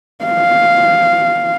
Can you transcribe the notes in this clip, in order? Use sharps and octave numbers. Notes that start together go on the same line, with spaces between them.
F5